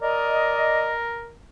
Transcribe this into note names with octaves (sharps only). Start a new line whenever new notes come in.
A#4 D5 D#5